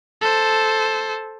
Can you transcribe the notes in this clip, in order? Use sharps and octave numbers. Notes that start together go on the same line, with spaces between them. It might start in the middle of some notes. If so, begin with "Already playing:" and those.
A4 C5